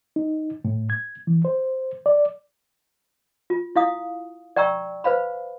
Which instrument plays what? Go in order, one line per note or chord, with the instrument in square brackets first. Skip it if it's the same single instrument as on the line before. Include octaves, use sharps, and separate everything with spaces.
[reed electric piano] D#4
A2
G#6
E3
C5
D5
[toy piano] F4
E4 F5 D#6
D5 G5 A#5 C#6 E6
B4 C5 F5 B5